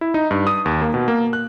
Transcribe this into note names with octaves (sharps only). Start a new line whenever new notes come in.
E4
D#4
G2
D#6
D#2
A#3
B2
A#3
F#6